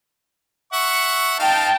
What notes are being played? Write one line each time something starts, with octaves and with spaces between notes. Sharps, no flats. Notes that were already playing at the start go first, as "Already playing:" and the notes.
E5 F#5 C#6
D#4 F5 G5 A5